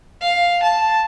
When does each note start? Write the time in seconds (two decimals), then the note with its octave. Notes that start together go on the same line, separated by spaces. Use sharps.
0.21 F5
0.63 A5